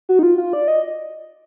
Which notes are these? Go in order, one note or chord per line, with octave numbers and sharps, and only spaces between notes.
F#4
D#4
F4
F4
D5
D#5